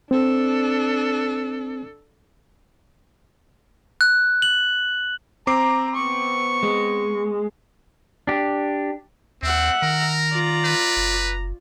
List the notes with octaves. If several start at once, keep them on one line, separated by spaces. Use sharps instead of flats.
C4 D4 A4
F#6
F#7
C4 A#5 D6 C7
B3 C#6
G#3
D4 G4
D#2 C4 E5 F#5
D#3 A#4 A#5
F4 D5
B4
F#1